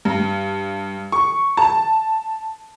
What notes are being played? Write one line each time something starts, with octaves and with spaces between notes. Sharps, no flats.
G2
C#6
A5